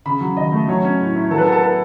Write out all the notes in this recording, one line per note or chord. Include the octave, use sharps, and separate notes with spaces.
C#3 B5
F#3
D#2 D#5
A3
F#3 C#5
C#4
A2
E4
F#3 A4
B4
A4
B3
A4
A4